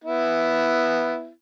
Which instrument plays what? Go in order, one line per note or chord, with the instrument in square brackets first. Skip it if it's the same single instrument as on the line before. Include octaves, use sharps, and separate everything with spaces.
[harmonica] B3 E4